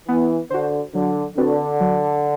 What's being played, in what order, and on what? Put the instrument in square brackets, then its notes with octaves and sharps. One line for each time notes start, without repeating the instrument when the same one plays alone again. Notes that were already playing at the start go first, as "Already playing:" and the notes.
[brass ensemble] E3 [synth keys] B3
[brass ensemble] D3 [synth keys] F#4 C5
[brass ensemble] D3 [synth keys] F#3
[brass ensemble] D3 [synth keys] C4 F#4 B4 D5
[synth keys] F#3